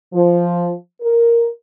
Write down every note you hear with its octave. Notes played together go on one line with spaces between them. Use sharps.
F3
A#4